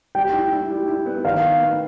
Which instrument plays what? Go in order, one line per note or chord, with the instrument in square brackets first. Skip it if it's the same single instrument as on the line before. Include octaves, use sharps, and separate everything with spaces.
[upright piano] G3 [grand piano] G5
[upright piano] E4
E4
G3
E4
B3
[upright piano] D#3 [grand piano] F5
[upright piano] D#3
B3